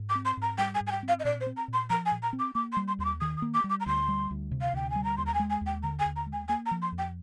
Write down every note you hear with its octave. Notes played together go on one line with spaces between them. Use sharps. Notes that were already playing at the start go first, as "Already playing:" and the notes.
Already playing: G#2
D6
C4
C6
G#2 A#5
G3 G5
G#5
G#2
G#5
G5
C4
F5
D#5
A#2 D5
C5
C4
A#5
A#2
C6
F3 A#5
G#5
A#2
A#5
C4
D6
A#3 D6
C6
G3
C6
D#2 C6
D6
D#3 D#6
D#6
A#3
D6
G3
D6
A#5
D2 C6
G3
D2
C3
F5
D2 G5
G#5
G3
A#5
D#2 C6
A#5
G#5
G#3
G#5
D#2
G5
D3 A#5
G#5
D#2
A#5
G#3
G#5
A#3 G#5
A#5
F3
C6
F2
G5